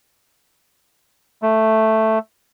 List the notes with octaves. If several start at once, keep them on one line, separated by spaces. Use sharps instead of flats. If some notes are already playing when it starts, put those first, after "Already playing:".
A3